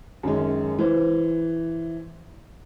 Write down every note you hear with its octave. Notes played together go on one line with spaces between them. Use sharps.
F#2 D#3 G#3 C#4
E3 C5